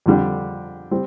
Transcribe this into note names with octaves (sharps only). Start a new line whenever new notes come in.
F2 D3 G3 D4 G4
G3 C4